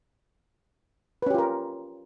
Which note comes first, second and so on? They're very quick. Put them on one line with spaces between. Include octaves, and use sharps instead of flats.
B4 C#4 G4 F4 A#4